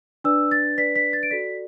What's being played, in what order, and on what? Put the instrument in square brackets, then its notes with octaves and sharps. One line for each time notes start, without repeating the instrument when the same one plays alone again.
[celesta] D4 B4 D5 E6
A6
D4 B4 D5 B6
B6
A6
D7
F#4 A4 D5 B6